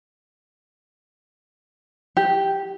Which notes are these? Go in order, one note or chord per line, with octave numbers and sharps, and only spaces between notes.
G4